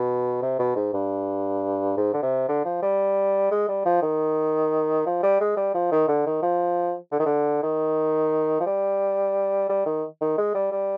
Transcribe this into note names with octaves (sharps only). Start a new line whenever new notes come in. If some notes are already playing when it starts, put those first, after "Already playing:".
Already playing: B2
C3
B2
G#2
G2
G#2
D3
C3
D3
F3
G3
G#3
G3
F3
D#3
F3
G3
G#3
G3
F3
D#3
D3
D#3
F3
D3
D#3
D3
D#3
F3
G3
G3
D#3
D#3
G#3
G3
G3